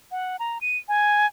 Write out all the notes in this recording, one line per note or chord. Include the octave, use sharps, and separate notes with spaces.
F#5
A#5
D#7
G#5